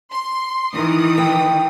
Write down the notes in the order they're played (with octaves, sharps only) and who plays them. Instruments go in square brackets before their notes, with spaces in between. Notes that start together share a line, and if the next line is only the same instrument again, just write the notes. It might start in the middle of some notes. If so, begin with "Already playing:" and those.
[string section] C6
D#3 E3 D#6
[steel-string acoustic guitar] G5